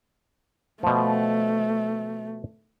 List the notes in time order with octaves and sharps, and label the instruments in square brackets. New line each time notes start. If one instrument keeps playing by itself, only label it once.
[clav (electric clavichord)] B2 F3 [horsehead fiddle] A3